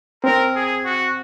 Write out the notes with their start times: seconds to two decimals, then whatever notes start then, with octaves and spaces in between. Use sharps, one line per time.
0.24 C4 A#4
0.55 G#4
0.85 F#4